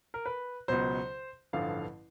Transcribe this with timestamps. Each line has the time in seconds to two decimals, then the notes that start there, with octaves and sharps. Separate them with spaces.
0.14 A#4
0.26 B4
0.68 C#2 B2 F#3 C5
1.53 A1 G2 D3 F3 F5